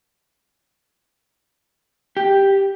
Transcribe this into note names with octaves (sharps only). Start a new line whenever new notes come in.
G4